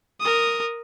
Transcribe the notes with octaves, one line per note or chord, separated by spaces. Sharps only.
A#4 D#6